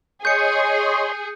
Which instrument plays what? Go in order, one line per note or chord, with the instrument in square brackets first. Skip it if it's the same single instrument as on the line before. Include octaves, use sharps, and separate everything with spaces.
[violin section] G#4 [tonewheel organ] C#5 D#5 C6 [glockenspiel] G6 C#7